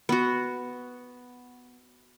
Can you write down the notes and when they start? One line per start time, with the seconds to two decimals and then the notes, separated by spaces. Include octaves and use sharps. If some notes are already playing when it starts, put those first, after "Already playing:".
0.09 B3 F#4